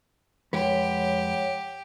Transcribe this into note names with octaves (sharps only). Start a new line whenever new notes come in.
F2 G#3 G4 B4 C#5 F#5